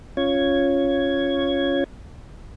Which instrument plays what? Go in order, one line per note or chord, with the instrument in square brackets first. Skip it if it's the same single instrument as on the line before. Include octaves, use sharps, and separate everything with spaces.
[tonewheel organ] C#4 F4 C#5 G#6